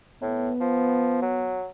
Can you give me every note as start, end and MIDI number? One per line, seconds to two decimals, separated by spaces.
0.22 0.50 45
0.22 1.60 59
0.60 1.19 53
1.22 1.67 54